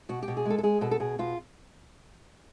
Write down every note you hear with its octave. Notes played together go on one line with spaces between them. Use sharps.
B2 F#4
G4
B2
G#4
G#3 A4
A4
G#3 G#4
B2 A4
A4
B2 G#4
B2 F4